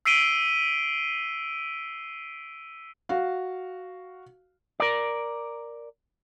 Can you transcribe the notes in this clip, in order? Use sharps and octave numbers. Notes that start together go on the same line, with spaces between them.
E6 B6 C7 D7 D#7 G7
F#4 F5
A#4 D5